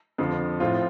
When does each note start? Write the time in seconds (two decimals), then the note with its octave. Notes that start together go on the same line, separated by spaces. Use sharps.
0.18 F2 D3 F3
0.60 A2 F3 C4 F4